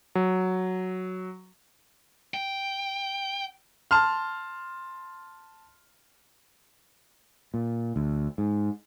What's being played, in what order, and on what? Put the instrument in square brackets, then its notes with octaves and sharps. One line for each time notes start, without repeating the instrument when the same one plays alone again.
[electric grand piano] F#3
[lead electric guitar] G5
[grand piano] A5 C6 F6
[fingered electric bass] A#2
D2
G#2